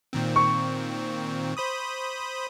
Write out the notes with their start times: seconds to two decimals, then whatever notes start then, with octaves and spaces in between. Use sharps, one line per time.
0.13 A#2 D#3 C4
0.36 C#6
1.57 C5 B5 D#6